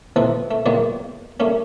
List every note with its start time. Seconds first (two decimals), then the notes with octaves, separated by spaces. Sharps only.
0.16 E3 F3 C4 D#4 A4 B4
0.51 A3
0.66 B1 A#2 D#3 G#3 A#3 D#5
1.40 G3 A3 A#3 C#4